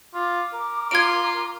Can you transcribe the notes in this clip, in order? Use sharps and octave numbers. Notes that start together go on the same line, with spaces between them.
F4 D6
A#4
F4 G#6 D7